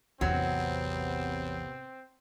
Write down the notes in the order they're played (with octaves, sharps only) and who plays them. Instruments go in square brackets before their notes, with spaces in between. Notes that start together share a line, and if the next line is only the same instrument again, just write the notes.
[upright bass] A1 E2 [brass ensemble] C3 B3 [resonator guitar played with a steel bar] F#3 [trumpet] C4